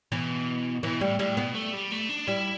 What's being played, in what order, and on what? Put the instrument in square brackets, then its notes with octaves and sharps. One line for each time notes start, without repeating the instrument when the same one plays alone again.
[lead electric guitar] B2 [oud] E3
[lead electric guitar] B2 [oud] E3
[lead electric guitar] A2 [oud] G3
[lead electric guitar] A2 [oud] G3
[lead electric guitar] B2 [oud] B3
[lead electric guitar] A3
G3
A3
D4
[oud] G3 [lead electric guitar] E4